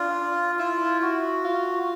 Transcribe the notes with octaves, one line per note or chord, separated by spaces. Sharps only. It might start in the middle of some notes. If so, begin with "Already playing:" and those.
Already playing: D4 F4
E4 F4
F#4
F4